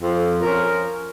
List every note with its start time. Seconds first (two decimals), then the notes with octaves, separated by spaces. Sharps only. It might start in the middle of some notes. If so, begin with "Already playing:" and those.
0.02 F2
0.42 F3 C#4 A#4